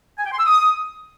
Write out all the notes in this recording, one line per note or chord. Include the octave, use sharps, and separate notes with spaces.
G#5
G5
C6
E6
D#6